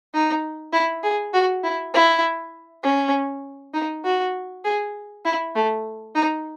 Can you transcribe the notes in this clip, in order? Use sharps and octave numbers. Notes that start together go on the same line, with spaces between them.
D#4
E4
G#4
F#4
E4
E4
C#4
D#4
F#4
G#4
E4
A3
D#4